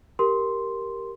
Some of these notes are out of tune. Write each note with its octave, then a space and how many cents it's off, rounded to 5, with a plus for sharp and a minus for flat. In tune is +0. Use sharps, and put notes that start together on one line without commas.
G4 +0 A#4 +0 C6 +0